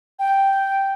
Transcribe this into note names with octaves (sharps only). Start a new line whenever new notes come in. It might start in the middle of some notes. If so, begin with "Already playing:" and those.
G5